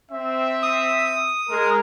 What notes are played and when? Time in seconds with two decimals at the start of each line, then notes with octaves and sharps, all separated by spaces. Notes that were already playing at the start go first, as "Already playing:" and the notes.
0.11 C4 E5
0.62 D#6
1.50 G#3 A#4